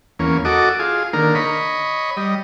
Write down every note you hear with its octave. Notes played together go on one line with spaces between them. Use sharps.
E2 A#3 C#4
F#4 A4 D#5 D6
F4 G#4
D3 D#3 A#3 A#4
C#5 D#5 B5
G3 D#5